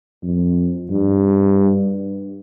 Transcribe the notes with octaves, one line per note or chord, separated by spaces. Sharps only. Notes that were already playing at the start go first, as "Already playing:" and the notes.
F2
G2